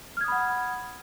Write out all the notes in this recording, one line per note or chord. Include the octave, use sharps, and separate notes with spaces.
F#5 B5 D#6 F6 G#6